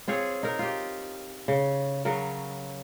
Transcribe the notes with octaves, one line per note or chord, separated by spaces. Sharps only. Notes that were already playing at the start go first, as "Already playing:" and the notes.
C4 F4 G#4 C#5
D#4 A#4
F4 G4
C#3
C#3 F#3 A#4